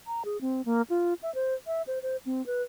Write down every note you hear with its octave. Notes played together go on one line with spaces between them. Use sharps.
A#5
G#4
C4
A#3
F4
E5
C5
E5
C5
C5
C4
B4